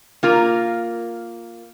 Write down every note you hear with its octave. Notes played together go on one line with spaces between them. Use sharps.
A#3 F4 A#4